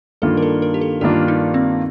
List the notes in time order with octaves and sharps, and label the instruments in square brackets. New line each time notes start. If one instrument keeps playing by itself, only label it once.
[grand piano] G2 D#3 A#3 D4 F4 [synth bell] A4
[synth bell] A#4
A4
A#4
G4
A4
[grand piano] G2 D#3 A#3 D4 F4 [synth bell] G4
[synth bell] D#4
C4